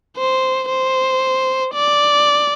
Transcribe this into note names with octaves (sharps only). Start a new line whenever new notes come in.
C5
C5
D5